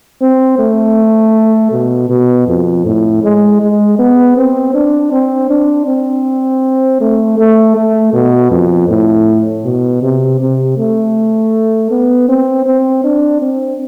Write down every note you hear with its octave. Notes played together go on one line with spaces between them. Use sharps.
C4
A3
B2
B2
F2
A2
G#3
G#3
B3
C4
D4
C4
D4
C4
A3
A3
A3
B2
F2
A2
B2
C3
C3
A3
B3
C4
C4
D4
C4